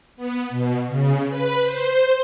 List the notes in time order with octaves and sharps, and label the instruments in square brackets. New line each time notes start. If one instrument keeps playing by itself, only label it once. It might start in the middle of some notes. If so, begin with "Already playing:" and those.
[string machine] B3
B2
C#3
B4
C5